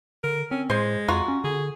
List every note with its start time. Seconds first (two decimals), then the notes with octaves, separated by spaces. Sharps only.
0.24 D3 A#4
0.51 C4 C#4
0.70 A2 G#3 C5 C6
1.08 F2 F4 F#4 A#5
1.28 C#4
1.44 D3 G#4